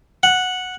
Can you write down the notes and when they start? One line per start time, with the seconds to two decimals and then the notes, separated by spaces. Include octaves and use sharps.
0.23 F#5